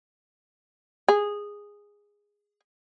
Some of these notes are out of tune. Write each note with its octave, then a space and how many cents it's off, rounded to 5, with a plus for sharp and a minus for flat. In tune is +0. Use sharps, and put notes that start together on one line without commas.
G#4 -10